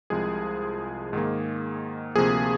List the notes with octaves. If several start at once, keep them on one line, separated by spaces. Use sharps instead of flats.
C2 C3 F3 G#3 G#4
G#2 D#3 A#3
D2 C3 F3 A#3 G#4